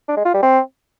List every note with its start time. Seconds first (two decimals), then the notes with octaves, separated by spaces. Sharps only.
0.08 D4
0.17 G#3
0.25 F4
0.34 G3
0.42 C4